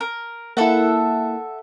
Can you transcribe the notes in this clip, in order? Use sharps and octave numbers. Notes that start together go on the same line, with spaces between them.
A#4
A#3 E4 A4 E5 F#5